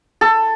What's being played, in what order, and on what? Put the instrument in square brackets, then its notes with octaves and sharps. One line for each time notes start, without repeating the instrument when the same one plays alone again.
[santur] A4